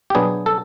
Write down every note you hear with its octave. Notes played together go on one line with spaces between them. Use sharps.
G4
B2 F#3 B3 D4 G#4
A4